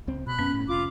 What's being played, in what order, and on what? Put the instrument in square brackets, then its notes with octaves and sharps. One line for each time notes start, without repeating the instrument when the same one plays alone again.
[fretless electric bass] C#2 C4
[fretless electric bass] B2 [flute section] B5 F#6
[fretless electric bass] F#2 B3 [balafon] C#4
[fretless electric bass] A2
[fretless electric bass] F1 [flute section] F4 D6